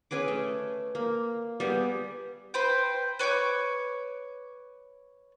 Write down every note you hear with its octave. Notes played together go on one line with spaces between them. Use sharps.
C#4 G#4 B4 D6
A3
A#3
G3 B3 G4 G#4
B4 C5 G5
B4 C#5 C#6 D6